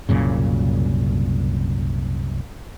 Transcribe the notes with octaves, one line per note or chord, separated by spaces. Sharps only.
C2 F#2 A#2 C#3